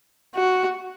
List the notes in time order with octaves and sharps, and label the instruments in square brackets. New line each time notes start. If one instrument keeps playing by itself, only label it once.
[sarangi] F#4